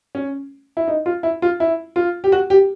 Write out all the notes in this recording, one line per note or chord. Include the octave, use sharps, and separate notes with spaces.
C#4
E4
D#4
F4
E4
F4
E4
F4
G4
F#4
G4